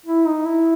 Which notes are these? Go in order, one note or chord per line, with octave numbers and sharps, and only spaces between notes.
E4
D#4
E4